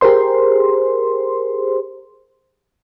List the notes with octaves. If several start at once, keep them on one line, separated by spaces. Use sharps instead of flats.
G4 G#4 A#4 C5 C6